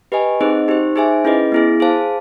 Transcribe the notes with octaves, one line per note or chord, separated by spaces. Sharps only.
G4 B4 D#5 G#5
C4 D#4 G#4 C5 D#5
D#4 G4 C5
D#4 G#4 C5 E5 G#5
C#4 E4 G#4 B4 D#5
B3 E4 G#4
G#4 C5 F5 A5